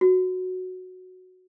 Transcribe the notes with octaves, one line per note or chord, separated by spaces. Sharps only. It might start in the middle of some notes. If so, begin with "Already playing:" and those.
F#4